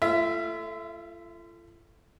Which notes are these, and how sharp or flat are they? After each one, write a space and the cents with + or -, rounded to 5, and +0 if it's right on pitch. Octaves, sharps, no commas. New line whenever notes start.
A3 +0 F4 -40 E5 +0